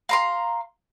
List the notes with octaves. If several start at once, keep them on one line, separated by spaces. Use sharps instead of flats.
F5 A#5 C6